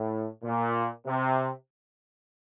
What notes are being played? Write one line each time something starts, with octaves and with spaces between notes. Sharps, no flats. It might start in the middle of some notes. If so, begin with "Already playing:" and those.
Already playing: A2
A#2
C3